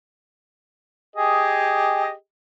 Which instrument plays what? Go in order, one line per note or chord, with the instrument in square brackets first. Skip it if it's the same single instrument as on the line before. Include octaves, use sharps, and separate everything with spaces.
[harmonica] G4 G#4 D#5